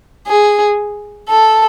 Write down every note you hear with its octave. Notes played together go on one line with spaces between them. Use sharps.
G#4
A4